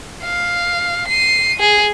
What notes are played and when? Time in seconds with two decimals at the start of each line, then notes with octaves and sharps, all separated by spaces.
0.24 F5
1.09 C7 D#7
1.59 G#4